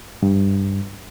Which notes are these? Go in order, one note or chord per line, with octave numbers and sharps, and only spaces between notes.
G2